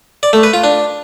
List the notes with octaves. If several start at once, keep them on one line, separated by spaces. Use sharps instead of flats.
D5
A3
B4
F4
D4